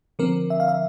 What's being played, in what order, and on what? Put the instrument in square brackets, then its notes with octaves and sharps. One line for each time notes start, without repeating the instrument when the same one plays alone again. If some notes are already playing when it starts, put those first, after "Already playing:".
[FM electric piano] D3 F3 C4 A#4
E5
F5
E5